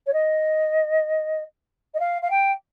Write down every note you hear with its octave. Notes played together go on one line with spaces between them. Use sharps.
C#5
D#5
D#5
F5
F5
G5